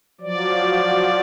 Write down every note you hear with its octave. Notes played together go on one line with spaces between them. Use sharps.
F3 F#3 D5